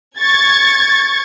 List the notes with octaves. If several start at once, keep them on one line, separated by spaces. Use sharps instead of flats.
C#6 G#6 A6